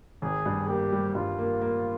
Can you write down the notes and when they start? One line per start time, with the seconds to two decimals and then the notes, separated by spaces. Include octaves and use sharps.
0.22 G#1 G#4
0.46 G2
0.68 A#3 G4
0.92 G3
1.15 G2 F4
1.39 A#3
1.62 A#3